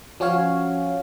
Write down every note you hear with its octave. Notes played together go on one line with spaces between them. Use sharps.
F3 C#4 F#4 C#5 F5